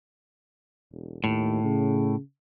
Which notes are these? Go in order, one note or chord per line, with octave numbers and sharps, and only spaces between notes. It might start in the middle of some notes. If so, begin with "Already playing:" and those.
E1
D#2 A2
C#3